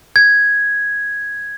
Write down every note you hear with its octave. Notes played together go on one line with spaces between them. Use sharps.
G#6